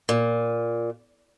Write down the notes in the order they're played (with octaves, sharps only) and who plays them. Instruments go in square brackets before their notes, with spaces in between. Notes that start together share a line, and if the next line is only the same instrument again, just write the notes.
[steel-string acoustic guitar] A#2